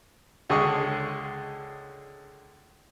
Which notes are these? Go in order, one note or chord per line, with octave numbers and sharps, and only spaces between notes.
C#2 D3 G#3 G#4 D#5 C#6